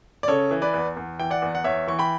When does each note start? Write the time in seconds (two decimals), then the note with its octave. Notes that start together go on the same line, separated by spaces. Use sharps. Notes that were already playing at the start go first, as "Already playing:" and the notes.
0.23 D5
0.28 C#3 A4 C#5
0.51 E3
0.62 B4 D5
0.74 E2
0.97 E2
1.19 E3 G5
1.30 D5 F#5
1.42 E2
1.55 F#5
1.64 E2 C#5 E5
1.88 E3 C#6
1.99 G5 B5